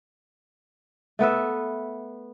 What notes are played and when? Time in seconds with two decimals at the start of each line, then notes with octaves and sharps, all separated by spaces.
1.19 A3 B3 B4 E5